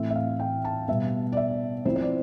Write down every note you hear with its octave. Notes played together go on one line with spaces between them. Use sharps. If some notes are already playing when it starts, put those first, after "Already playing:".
Already playing: A2 E3 A3 C4 E5
E5
F5
G5
A5
B2 G3 B3 E5
D5
E5
F3 C4 E4 C5
C5
D5